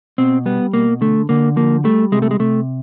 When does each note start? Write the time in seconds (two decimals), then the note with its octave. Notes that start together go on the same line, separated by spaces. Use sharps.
0.18 B2 C4
0.46 G3 B3
0.74 B2 A#3
1.01 D3 A3
1.29 D3 A#3
1.56 F3 A#3
1.84 G3 A3
2.12 C3 G#3
2.22 A3
2.31 G#3
2.40 C3 A3